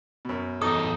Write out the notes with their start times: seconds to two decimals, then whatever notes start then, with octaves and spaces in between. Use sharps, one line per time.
0.25 F#2 B2
0.62 E2 D#4 A4 D#6